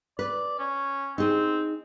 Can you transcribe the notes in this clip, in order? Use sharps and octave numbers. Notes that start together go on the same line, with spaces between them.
B4 D5
C#4
C4 D#4 G#4